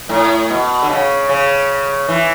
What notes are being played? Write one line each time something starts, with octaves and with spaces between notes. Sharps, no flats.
A2
B2
D3
C#3
C#3
E3